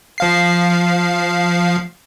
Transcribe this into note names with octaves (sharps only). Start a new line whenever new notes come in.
F3 F5 C7